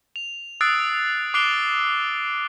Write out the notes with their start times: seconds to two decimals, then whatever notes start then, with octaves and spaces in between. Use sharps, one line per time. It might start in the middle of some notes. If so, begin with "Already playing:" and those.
0.16 F7
0.61 D#6 E6 F#6 A6 C7 D7
1.34 D6 F#6 C7 D7 F7 G7